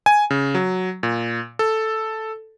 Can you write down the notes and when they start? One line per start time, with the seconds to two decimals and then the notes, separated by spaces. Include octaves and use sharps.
0.06 G#5
0.30 C#3
0.55 F#3
1.03 A#2
1.59 A4